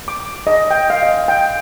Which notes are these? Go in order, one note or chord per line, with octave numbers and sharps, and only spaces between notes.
D6
D#5
G5
F5
D#5
G5